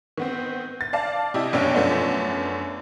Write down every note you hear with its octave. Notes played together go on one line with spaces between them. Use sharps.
D#3 B3 C4
A6
D5 F5 A5
C3 E4 G4 D#5
F1 F#2 B2 D4 C#5 G5
F#2 F3 A3 B3 D4